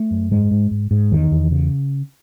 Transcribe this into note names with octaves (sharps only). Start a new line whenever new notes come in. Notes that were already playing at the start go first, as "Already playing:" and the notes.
Already playing: A3
F#2
G#2 G#3
G#2
G#2
G#2
E2 D#3
E2
C#3